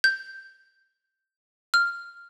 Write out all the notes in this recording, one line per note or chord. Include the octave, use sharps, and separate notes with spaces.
G6
F6